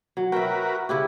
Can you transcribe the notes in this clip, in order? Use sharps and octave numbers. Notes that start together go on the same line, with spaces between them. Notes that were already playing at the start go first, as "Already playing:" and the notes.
F#3
F#4 A#4 B4 E5 G5
C#3 E4 G4